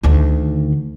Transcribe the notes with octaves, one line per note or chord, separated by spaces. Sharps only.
D2 D#3